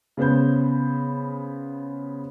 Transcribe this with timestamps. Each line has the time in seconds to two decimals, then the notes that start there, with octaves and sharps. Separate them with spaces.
0.17 C#3 B3 C5 G6